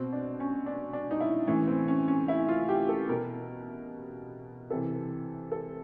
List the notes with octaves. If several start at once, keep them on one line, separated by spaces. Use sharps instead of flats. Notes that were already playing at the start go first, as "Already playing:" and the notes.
Already playing: B2 C4
D4
C#4
D4
D4
D#4
E4
A2 E3 C#4
C4
C#4
C#4
E4
F4
G4
A4
B2 A#4
C3 E3 A4
A4